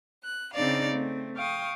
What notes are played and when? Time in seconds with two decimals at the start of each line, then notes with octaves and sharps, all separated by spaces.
0.24 F#6
0.54 C#3 C4 D4 D#4 D5 F5
0.90 A3 C4
1.37 F5 G5 C#6 D#6